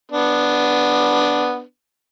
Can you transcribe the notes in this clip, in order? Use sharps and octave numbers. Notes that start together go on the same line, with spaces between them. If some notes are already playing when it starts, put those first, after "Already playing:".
B3 D4